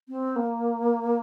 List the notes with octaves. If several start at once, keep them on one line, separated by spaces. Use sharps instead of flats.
C4
A#3